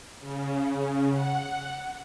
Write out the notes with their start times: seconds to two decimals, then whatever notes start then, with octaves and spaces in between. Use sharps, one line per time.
0.20 C#3
1.10 F#5